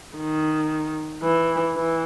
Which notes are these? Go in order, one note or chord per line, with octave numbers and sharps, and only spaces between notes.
D#3
E3
E3